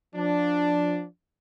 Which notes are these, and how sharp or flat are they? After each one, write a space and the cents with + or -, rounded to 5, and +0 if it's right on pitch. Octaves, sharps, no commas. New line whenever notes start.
F3 +20 D4 +0